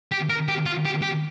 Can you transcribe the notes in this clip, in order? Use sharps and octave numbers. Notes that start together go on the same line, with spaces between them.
G4
A#4
G4
F4
G4
G4